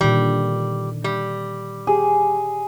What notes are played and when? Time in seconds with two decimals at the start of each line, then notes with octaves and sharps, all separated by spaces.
0.01 A#2 D3 D#3 G3
1.04 G3
1.87 G4 G#4